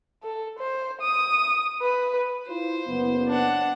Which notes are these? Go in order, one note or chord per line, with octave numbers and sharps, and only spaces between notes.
A4
C5
D#6
B4
E4 F4 C5
F#1 B3
D4 F#5